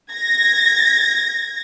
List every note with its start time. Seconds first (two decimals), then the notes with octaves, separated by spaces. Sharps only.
0.11 G#6 A#6